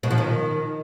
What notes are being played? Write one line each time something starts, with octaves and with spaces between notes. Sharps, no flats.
B2
F3
D#3